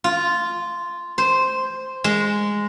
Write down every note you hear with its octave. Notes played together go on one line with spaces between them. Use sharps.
F4
C5
G#3